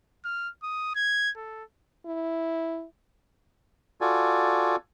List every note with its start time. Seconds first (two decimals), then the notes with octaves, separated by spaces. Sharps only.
0.24 F6
0.63 D#6
0.95 G#6
1.37 A4
2.06 E4
4.01 F4 F#4 A4 D5 G#5